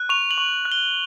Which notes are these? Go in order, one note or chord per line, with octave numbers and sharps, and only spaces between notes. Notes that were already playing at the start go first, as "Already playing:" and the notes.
Already playing: F#6
C#6 F7
F#7
C#6
F#6
G7